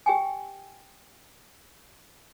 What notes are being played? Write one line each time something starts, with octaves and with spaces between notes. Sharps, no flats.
G4 G5 G#5